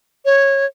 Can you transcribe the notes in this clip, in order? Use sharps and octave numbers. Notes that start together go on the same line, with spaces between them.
C#5